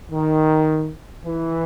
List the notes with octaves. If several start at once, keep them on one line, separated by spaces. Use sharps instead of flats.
D#3
E3